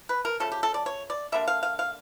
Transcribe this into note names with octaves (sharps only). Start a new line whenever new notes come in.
B4
A#4
C#3 F3 A3 C#4 A4
G4
A4
D5
C#5
D5
D3 G3 A#3 D4 E5
F5
F5
F5